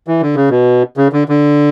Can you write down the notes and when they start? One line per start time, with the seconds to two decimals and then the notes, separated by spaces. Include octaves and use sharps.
0.08 E3
0.22 D3
0.35 C#3
0.50 B2
0.97 C#3
1.13 D3
1.29 D3